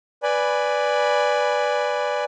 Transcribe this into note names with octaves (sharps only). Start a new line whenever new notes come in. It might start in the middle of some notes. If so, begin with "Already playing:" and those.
B4 D5 G#5 B5